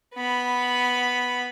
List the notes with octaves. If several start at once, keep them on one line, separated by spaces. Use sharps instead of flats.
B3 B5